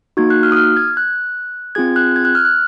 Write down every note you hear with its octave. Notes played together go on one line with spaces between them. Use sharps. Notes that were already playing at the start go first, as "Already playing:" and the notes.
A#3 D#4 F#4 G#6
F#6
F6
D#6
F6
G#6
F#6
C4 F4 G#4 G#6
F#6
G#6
F#6
F6
F#6